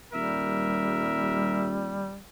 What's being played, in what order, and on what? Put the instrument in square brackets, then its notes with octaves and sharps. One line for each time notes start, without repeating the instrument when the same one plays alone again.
[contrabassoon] D#1 [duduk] G3 [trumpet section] A#4 E5